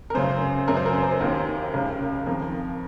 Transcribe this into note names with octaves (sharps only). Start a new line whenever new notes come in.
A#4
F#2 C#3 C5
F#2 C#3 A#4
C5
A#4
C5
A#4
C5
D#2 D#3 A#4
C#2 C#3 A#4
F2 D#3 A#4